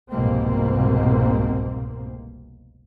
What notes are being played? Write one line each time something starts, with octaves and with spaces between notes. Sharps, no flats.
F1 C2 G#2 B2 A#3 C4